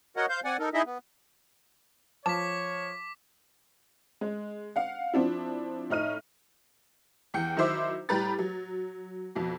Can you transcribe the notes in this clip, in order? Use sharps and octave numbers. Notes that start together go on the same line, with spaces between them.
F#4 A#4 C#5 D#5 F#5
C5 F5 G6
C4 D5 F#5 G#5
D#4 A4 A#4
D#4 E4 G#4 D#5 E5
B3
F3 C#5 A5 D6 B6
G#3
F5 F#5
F3 C4 D4 E4
A2 D#4 F6 D#7
E2 G5 C#7
D#3 F#3 E4 C5 E5 D6
A2 G3 G4 B4 A#5 A6
F#3
F2 B2